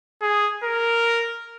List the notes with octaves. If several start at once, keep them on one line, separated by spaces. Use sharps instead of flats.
G#4
A#4